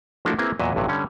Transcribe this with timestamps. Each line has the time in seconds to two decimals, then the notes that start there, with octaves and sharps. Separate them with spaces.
0.25 F3 A3 A#3 D4 E4 F#4
0.39 A#3 C4 E4 G#4 B4
0.59 E2 A#2 F#3 D#5 E5
0.75 A1 G2 C3 F#3
0.88 D3 G3 C#4